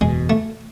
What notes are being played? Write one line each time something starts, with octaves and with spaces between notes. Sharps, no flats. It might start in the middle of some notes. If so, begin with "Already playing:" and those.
F#1 E2 B2 G#3
A3